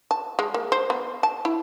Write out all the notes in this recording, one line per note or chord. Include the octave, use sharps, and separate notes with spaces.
A5
G#3
A#3
C5
B3
A5
E4